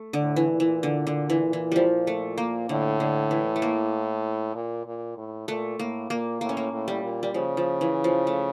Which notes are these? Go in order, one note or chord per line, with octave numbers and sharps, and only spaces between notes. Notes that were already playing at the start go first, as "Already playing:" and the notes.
Already playing: A3
D3
A2
E3
A#2
E3
D3
D3
E3
E3
F3 G3
A3
A#3
A2 D3
D3
E3
A3
A#3
A#2
A#2
A2
A#2 A3
A2 A#3
A#2 A#3
A2 A#3
C#4
A#3
A2
G3
A#2
G3
C#3 F3
F3
E3
F3
A3